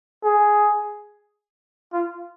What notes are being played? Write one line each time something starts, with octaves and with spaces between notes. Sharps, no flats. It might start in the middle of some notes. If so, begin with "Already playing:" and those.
G#4
F4